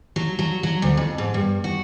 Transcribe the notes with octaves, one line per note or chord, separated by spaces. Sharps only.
F#3
F#3
F#3
D2
F2
G#2
G2
F#4